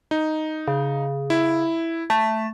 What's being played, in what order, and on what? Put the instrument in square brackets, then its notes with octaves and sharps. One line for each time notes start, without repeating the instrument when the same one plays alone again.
[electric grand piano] D#4
[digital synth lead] C#3
[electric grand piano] E4
[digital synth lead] A3 [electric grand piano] A5